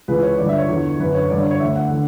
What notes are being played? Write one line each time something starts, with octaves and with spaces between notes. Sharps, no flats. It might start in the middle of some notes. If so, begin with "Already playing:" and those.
C#2 C#3 E3 B4
C#5
G2 D3 D5
E5
C#5
E2 D3
F#2 D3 B4
C#5
G2 D3 D5
C#5
C#5
D2 D3 E5
F#5
D3